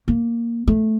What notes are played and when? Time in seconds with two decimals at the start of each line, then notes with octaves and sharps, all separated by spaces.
0.08 A#3
0.67 A3